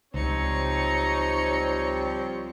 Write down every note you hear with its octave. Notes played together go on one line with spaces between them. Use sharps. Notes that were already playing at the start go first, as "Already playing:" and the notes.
C#2 F3 G3 C4 D#4 C#5 C#7